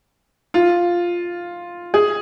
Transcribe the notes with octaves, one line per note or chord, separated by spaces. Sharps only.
F4
G#4